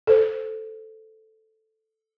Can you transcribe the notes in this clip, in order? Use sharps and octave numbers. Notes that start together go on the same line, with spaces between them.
A4 C5